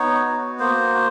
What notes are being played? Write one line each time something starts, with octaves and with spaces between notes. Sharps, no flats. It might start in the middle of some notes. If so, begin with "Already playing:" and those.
Already playing: B3 D#4 C#5
F#4
A#3 C5